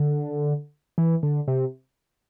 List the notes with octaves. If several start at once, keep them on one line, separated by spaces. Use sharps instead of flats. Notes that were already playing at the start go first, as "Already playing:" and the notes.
Already playing: D3
E3
D3
C3